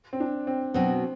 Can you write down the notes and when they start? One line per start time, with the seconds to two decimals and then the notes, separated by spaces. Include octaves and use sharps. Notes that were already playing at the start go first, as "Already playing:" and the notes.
0.13 C4
0.20 D4
0.47 C4
0.74 B2 F#3 B3 C4